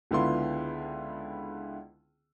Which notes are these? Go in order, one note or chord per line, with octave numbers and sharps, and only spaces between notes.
C#2 D3 B3 E4 F4 C6